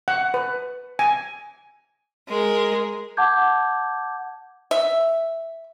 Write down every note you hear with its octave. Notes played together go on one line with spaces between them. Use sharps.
F#5
B4
G#5
G#3 A#4
F#5 A5 D6 G6 G#6
E5